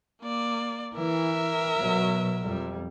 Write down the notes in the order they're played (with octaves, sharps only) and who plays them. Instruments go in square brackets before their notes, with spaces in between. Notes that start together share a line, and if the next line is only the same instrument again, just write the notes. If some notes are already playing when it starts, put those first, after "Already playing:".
[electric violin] A#3 D5
[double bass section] E3 [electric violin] A#4 E5
[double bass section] B2 F#3
F2 G3